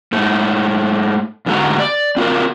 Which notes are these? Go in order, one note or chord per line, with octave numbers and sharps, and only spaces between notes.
G#2 A3
E2 G#2 D3 A3 F#4 A#5
D5
C4 F4 F#4 A#4